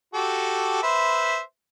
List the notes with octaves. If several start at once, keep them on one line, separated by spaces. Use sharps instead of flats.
F#4 G4 A4
B4 C5 E5